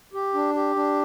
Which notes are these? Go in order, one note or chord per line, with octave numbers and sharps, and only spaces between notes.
G4
D4
G4
D4